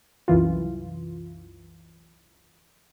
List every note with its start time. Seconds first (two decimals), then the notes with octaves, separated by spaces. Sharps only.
0.28 C2 F#2 E3 F4